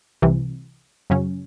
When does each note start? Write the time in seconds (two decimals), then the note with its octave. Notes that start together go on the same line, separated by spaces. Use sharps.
0.22 C2 C3 E3
1.10 F#2 C#3 F#3 C#4